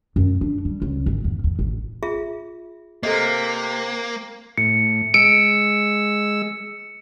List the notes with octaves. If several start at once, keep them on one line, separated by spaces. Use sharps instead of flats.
F#2
D4
G3
C#2
G#1
E2
E2
A1
F4 G#4 E5
C3 A#3 A4 D#5
A2 C#7
G#3 E6 C#7 D7